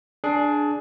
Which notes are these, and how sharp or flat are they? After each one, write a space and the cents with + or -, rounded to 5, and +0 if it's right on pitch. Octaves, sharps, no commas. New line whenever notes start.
D4 +0 G#4 +20